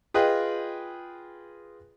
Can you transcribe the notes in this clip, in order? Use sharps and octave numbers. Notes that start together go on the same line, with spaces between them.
F4 G#4 B4 D#5 G5